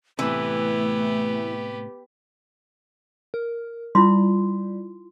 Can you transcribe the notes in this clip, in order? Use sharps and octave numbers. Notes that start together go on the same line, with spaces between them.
A2 C3 E3 A3 B3 G4
A#4
G3 E4 F4 C6